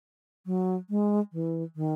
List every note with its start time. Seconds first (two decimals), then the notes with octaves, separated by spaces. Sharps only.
0.46 F#3
0.90 G#3
1.33 E3
1.76 D#3